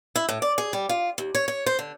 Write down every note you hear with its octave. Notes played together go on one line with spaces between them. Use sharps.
E4
A2
D5
G#4
G3
F4
D#2
C#5
C#5
C5
D3